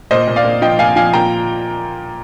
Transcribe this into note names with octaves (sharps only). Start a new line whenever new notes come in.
A#2 C5 D#5
A#2
D5 F5
A#2
F3 D#5 G5
A#2 F5 G#5
F3 F5 G#5
A#2 G5 A#5